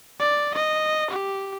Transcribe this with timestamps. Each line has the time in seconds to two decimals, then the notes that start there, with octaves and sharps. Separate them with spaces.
0.20 D5
0.54 D#5
1.11 G4